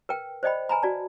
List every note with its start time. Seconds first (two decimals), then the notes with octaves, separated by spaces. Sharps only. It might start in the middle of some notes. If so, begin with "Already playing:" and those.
0.09 A#4 B4 G5
0.43 C5 D5 D#5 G5 B5
0.69 B4 G#5 A#5 B5
0.83 F#4 D5 A5